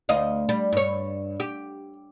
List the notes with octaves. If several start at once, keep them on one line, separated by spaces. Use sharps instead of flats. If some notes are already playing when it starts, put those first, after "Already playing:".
D2 D#5 F5
G3
G2 C#5
G4